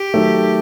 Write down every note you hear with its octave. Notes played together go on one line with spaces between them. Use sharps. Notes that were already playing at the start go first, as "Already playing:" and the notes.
Already playing: G4
D#3 F#3 A3